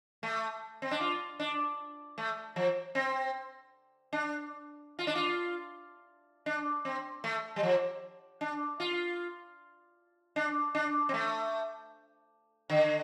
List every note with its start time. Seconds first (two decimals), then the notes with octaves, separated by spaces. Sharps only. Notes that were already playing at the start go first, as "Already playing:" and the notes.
0.23 A3
0.82 C4
0.91 D4
1.01 F4
1.39 D4
2.18 A3
2.56 F3
2.95 C4
4.13 D4
4.99 F4
5.07 D4
5.15 F4
6.46 D4
6.85 C4
7.24 A3
7.56 G3
7.63 F3
8.41 D4
8.80 F4
10.36 D4
10.75 D4
11.09 C4
11.14 A3
12.70 D3